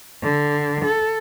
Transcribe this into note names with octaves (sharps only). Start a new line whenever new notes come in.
D3
A4